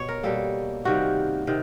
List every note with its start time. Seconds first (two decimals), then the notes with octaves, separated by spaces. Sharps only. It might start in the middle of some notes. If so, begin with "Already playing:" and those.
Already playing: B2 C#5
0.08 A#4
0.23 B2 G3 A#3 A4
0.85 C3 D#3 G3 A#3 F#4
1.47 C3 D#3